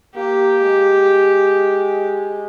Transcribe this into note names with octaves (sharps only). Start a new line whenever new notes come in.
A#3 G4
G#3